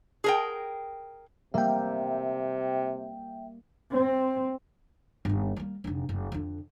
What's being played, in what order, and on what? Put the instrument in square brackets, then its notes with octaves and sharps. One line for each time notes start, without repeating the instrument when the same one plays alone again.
[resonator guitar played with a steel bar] G#4 A#4 G5
[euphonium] C3 [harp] G3 A#3 [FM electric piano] E5 G5
[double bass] C4
[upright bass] G1 D#2
G3 A#3
F1 D3
F#1
F2 D3